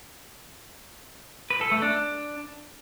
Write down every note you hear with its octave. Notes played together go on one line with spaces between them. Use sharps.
B4
A4
A3
D4